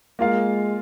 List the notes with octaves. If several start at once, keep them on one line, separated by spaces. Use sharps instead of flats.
G#3 A#3 F4 A#4 F5